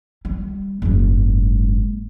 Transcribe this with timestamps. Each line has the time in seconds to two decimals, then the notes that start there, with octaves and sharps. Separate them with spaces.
0.25 G3
0.82 F#1 G#2